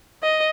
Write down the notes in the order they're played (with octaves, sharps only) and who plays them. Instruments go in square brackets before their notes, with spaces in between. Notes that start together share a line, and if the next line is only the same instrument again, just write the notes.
[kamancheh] D#5